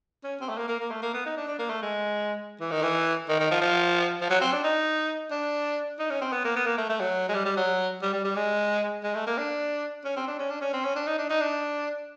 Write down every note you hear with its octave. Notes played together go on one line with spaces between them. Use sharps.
C#4
C4
A3
A#3
A#3
A#3
A3
A#3
B3
D#4
D4
D4
A#3
A3
G#3
E3
D#3
E3
D#3
D#3
F3
F3
F3
F#3
C4
D4
D#4
D4
D#4
C#4
C4
B3
A#3
B3
A#3
A3
A3
F#3
G#3
G3
G3
F#3
G3
G3
G3
G#3
G#3
A3
A#3
D4
C#4
C4
D4
C#4
D4
C#4
C4
C#4
D4
D#4
D4
D#4
D4